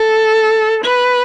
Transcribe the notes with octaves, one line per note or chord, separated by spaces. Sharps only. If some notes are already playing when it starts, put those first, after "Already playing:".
Already playing: A4
B4